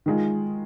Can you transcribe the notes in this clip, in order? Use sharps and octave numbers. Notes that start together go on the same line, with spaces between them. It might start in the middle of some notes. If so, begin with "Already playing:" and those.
D#3 G#3 F4